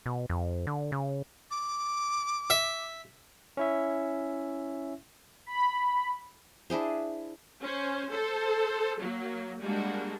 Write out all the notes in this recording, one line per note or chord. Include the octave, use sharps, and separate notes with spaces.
B2
F2
D3
C#3
D6
E5
C#4 E4 E5
B5
D4 E4 G#4 C5
C#4 C5
A4 C5
F#3 A#3
G3 G#3 A#3 D4 F#4